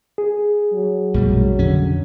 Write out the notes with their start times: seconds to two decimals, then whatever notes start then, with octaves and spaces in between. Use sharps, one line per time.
0.18 G#4
0.73 F#3
1.14 A#1 F#2 B2 G3 A3
1.58 F2 B2 D3 C#4